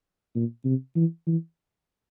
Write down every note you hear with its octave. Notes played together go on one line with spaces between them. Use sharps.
A#2
C3
E3
E3